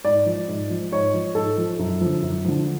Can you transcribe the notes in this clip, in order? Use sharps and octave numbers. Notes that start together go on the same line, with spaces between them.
G#2 D5
F3
G#2
F3
G#2 C#5
F3
G#2 A4
F3
F#2
D3 F3
F#2
D3 F3